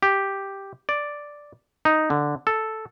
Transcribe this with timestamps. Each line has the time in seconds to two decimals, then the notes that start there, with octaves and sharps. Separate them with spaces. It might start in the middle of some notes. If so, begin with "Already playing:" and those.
0.03 G4
0.89 D5
1.85 D#4
2.10 D3
2.47 A4